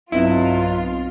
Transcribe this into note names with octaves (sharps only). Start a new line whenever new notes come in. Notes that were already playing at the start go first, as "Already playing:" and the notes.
B1 G2 F#3 C4 E4 F4 D#5